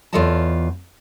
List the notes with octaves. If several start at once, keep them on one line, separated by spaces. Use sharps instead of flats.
E2 F4 A4 C#5 D#5 A5